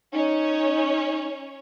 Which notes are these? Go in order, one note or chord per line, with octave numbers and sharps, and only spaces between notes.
C#4 D#4 C#5